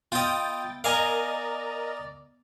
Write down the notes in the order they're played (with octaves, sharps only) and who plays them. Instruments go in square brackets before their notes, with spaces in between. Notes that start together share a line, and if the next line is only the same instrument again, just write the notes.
[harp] B3 E5 E6 [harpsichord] F4 D#5 [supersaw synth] G5 A6
[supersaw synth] A#4 D#5 A#5 [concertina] D5 [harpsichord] F5 G#5